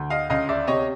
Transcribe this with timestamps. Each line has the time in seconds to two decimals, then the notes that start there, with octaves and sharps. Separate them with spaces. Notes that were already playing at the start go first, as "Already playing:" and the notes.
Already playing: D2
0.10 D#5 F5
0.30 C#2 D#5 F5
0.49 D5 E5
0.67 C3 C#5 D#5